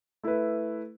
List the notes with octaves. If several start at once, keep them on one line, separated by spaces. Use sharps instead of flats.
A3 E4 B4